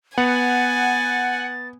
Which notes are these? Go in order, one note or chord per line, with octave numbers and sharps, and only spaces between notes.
B3 F#5 G#5 A6